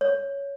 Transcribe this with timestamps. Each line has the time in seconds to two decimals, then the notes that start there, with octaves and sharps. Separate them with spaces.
0.01 C#5